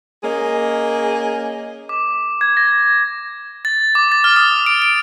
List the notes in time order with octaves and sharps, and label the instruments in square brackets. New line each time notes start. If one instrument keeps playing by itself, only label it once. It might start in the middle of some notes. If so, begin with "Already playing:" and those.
[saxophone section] A#3 C#4 G#4 D#5
[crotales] D6
G#6
A#6
A6
D6
A6
F6
D#6
D7
D7